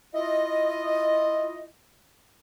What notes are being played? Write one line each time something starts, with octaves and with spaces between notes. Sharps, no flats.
E4 F4 D#5